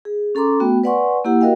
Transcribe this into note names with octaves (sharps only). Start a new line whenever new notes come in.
G#4
C#4 A4 A#5 C6 D6
A3 B3 F#4 G5
B4 D5 F#5 G#5 C6 C#6
A#3 E4 G4 F#5
F#4 A#4 D#5 F5 G5